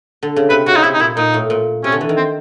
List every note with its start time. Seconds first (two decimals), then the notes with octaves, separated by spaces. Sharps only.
0.23 D3
0.36 C#3
0.49 C3 B4
0.66 C#3 F#4
0.76 D#4
0.83 C3 E4
0.94 D#4
1.00 A#2 E4
1.17 A#2 D#4
1.34 A2
1.50 A#2
1.84 C3 C#4
1.92 D3
2.01 E3
2.09 D#3
2.17 C4